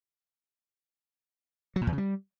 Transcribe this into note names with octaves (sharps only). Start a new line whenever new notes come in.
F#3
A#2
E2
C#3
G3